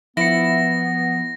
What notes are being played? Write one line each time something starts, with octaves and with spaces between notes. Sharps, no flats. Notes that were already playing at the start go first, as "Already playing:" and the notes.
F3 B3 E4 A#6 C#7